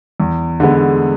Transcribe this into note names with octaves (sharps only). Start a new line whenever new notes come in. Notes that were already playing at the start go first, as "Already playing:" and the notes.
E2
D3 G#3 B3